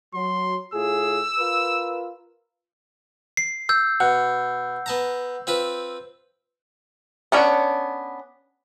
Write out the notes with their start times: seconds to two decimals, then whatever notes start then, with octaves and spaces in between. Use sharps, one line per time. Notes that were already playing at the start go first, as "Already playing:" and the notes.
0.14 F#3 C6
0.74 A2 F4 G#4 E6
1.39 F4 A#4 B4
3.37 C7
3.69 E6 G6
4.00 B2 F#5
4.86 B3 A5 A#5
5.47 C4 F4 B4
7.32 B3 C#4 D4 C#5